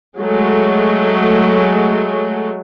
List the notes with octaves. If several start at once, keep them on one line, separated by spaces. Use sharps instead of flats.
F#3 G#3 A3